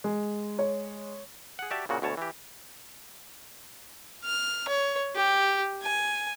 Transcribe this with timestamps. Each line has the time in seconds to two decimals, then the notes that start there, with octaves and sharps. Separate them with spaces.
0.04 G#3
0.59 C#5
1.59 G#4 F#5
1.71 F#4 G4 D5 E5 A5
1.89 A#2 C#3 F#4
2.02 D2 B2 C#5 A5
2.17 E3 G4
4.25 F6
4.69 C#5
5.16 G4
5.83 G#5